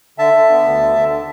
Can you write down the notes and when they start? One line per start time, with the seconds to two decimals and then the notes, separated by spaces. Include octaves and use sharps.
0.18 D3 E5 A5
0.34 D3
0.49 B3
0.64 D2
0.81 D3
0.96 D3